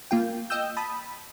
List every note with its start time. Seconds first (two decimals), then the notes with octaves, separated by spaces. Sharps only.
0.11 A#3 F4 G5
0.50 D#5 G5 D#6 E6 G6
0.77 A5 B5 D#6